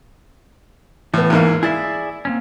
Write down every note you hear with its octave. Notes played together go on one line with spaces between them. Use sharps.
A2 E3 B3
E2 G#2 A#3
E4 G#4 D5 E5
A#3 C4 C#4